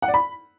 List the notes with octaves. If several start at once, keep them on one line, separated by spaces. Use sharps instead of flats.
F#5
D5
B5